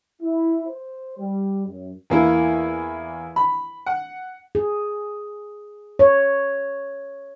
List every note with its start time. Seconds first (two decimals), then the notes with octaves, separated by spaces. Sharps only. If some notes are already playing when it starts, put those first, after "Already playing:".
0.21 E4
0.66 C5
1.18 G3
1.67 F#2
2.10 E2 A#3 E4
3.36 B5
3.86 F#5
4.55 G#4
5.99 C#5